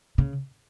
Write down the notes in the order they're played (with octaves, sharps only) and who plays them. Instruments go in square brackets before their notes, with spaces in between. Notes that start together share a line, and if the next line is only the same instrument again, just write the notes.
[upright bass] C#3